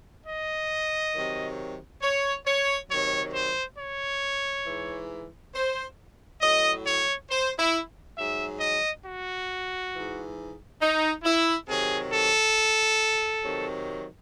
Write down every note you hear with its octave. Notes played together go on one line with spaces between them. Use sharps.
D#5
C3 D#3 F#3
C#5
C#5
C3 D#3 F#3 C#5
C5
C#5
G#2 E3
C5
A2 F#3 D#5
C#5
C5
E4
G#2 F#3 E5
D#5
F#4
G#2 E3
D#4
E4
C3 D#3 F#3 G#4
A4
C3 D#3 F#3